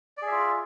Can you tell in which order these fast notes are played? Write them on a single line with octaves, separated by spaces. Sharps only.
D5 G#4 E5 F4